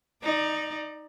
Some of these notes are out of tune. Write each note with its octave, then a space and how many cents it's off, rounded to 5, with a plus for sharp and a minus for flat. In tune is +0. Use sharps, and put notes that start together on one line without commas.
D#4 +0 D5 +25